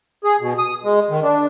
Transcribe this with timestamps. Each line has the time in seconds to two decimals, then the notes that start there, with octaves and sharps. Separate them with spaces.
0.24 G#4
0.41 B2
0.59 D#6
0.84 G#3
1.10 D#3
1.23 D4